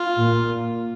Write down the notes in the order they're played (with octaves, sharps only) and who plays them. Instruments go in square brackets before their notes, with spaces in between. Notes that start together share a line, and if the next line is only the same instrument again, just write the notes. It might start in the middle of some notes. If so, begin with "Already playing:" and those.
Already playing: [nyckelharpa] F4
[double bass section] A#2